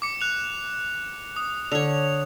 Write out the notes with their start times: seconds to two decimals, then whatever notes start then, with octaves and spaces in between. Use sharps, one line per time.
0.02 D6 C#7
0.21 F#6 F7
1.36 D#6
1.72 D3 C#5 F7